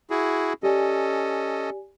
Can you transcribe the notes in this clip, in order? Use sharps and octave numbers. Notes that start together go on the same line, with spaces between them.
E4 F#4 G#4
C#4 G4 A4 D5 D#5 G#5